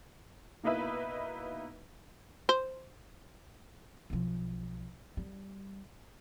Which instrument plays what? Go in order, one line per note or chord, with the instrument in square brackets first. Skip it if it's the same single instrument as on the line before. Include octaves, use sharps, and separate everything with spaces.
[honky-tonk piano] B2 A#3 D#4 E4 B4 E5
[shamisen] C5
[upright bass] B1 F3
G3